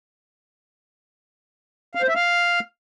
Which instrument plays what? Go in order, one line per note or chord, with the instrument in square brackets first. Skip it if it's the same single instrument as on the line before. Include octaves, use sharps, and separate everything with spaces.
[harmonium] F5
C5
E5
F5